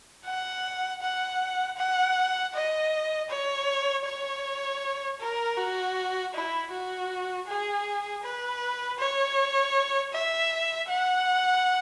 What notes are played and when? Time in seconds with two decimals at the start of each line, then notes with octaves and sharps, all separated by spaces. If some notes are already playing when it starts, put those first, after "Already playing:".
0.25 F#5
1.01 F#5
1.77 F#5
2.54 D#5
3.29 C#5
4.05 C#5
5.20 A#4
5.57 F#4
6.33 E4
6.71 F#4
7.47 G#4
8.23 B4
8.99 C#5
10.13 E5
10.89 F#5